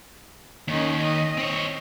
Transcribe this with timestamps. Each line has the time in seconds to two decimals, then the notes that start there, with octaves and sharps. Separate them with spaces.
0.68 D#2 D#3 C#4
1.01 D#5
1.38 C4 C#5